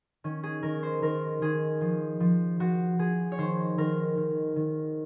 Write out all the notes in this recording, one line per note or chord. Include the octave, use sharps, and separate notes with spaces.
D#3 C#4
G#4
D#3 A#4
C5
D#3 A#4
D#3 G#4
F3
F3
F3 F#4
F3 G#4
C#5
D#3 C5
D#3 A#4
D#3
D#3